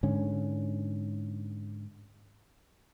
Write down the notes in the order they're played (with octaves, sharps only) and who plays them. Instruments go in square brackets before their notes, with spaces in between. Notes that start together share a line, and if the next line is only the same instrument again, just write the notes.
[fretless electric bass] G#2 D3 C#4